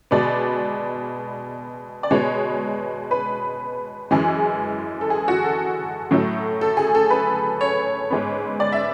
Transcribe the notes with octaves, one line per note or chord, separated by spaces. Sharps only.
B2 G#3 B3 D5
D5
B2 G#3 B3 C#5
B4
F#2 E3 G#3 G#4
A4
G#4
F#4
A4
A2 F#3 A3
A4
G#4
A4
B4
C#5
G#2 G#3 B3
D5
E5